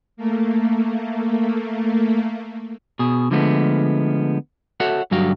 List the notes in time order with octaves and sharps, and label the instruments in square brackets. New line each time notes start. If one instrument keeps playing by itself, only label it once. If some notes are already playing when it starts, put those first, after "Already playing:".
[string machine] A3 A#3
[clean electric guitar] B2 G#4
D3 F3 G#3 A3 B3
F#4 A4 C#5 E5 F#5
G2 D3 F#3 F#4 G4 F5